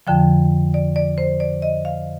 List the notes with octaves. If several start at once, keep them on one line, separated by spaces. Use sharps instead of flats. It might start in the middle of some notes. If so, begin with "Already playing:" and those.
F2 D3 F3 G5
D5
D5
C5
D5
D#5
F5